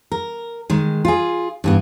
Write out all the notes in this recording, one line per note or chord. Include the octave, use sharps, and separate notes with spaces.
A#4
D#3 G#3
F4 G#4
G2 E3 B3